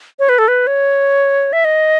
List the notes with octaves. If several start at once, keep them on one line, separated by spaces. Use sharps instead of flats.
C#5
B4
A4
B4
C#5
E5
D#5